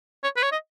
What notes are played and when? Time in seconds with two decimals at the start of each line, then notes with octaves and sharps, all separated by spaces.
0.24 C#5
0.37 B4
0.43 C#5
0.52 D#5